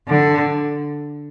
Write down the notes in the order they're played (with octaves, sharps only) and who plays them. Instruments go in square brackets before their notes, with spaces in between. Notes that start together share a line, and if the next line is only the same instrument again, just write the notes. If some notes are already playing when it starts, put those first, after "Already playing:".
[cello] D3